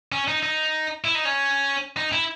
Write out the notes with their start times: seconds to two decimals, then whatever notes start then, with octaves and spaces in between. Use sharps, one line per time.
0.12 C#4
0.28 D#4
0.43 D#4
1.04 E4
1.15 D#4
1.25 C#4
1.97 D#4
2.12 E4